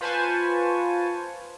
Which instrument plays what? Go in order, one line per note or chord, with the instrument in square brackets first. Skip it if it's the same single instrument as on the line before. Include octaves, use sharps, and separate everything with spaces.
[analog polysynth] F4 B4 C5 G#5 A5 C#6